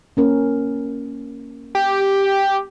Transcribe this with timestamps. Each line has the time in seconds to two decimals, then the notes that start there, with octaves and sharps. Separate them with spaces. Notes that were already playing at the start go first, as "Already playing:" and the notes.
0.17 A#3 C#4 A#4
1.75 G4